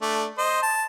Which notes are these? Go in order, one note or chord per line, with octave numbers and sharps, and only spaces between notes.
A3 D4
C5 D#5
A5